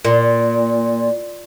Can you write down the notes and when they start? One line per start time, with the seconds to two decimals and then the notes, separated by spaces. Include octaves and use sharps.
0.05 A#2